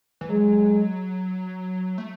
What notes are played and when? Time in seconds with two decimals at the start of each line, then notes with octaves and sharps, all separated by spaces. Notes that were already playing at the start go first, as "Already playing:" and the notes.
0.21 E3
0.29 F#3 G#3
1.98 A3